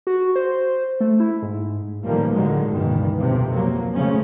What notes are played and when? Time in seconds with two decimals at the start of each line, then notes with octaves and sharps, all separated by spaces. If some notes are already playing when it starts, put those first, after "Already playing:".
0.07 F#4
0.36 C5
1.00 A3
1.20 E4
1.42 G#2
2.04 A1 D2 D#3 F3 G3 A#3
2.34 D3 D#3 F#3 G#3
2.70 G1 C#2 G2 B2 D#3 E3
3.17 B1 F2 C3 F3
3.54 F3 F#3 A#3
3.94 C#2 C#3 F3 A3 C#4